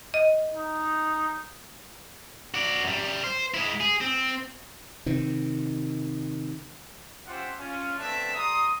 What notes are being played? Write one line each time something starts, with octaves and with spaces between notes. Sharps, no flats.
D#5
D#4
F#4 D5
F#2 G3
C5
G#3 E4
G#4
C4
C3 D#3
C#4 F4 G4 C5 E5 F#5
C#4 F4
A3 B3 C4 D4 E5 A5
G3 A#5 C6 D#6